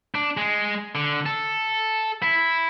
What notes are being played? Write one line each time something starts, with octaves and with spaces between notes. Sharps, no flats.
D4
G#3
D3
A4
E4